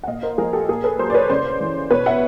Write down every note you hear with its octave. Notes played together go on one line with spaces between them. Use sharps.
F#5
A#2 D#5 F5
A#4 C5
F3 G#4 A#4
G4 A4
A#2 G#4 A#4
A4 B4
F#3 A#4 C5
D5
B4 C#5
C#3 C5 D5
E3
B2 B4 C#5
E5 F#5